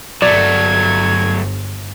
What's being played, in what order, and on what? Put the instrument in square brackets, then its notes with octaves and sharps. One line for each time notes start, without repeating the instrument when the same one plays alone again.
[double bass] G1 [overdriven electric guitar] F#3 A3 [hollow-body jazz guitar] D5 [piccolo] G#6